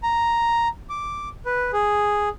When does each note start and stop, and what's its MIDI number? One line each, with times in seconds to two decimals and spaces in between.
0.03 0.68 82
0.90 1.29 86
1.46 1.71 71
1.73 2.29 68